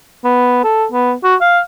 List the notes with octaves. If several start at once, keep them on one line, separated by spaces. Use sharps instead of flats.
B3
A4
B3
F#4
F5